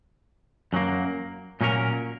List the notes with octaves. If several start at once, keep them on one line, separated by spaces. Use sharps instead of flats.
F#2 F#3 A#3
A#2 F#3 A#3 C#4 A#4